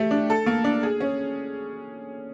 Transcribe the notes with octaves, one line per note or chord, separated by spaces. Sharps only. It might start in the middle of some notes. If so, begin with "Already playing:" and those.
Already playing: A3 G4
D4
A4
A#3
D4
G#4
C#4